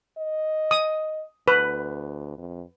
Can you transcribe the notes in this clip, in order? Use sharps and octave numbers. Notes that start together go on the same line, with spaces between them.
D#5
D#6
D2 B4
F2